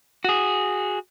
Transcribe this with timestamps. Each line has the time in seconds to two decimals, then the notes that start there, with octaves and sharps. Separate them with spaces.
0.24 F#4 G#4